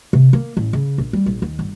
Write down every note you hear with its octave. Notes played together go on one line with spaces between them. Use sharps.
C3
A#3
A1
C#3
A#1
G3
A#1
D#2
G1